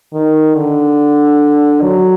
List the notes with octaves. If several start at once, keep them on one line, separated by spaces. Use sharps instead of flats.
D#3
D3
F#3